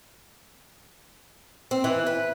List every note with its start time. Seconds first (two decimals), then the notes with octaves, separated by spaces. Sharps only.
1.71 C4
1.84 E3
2.07 B4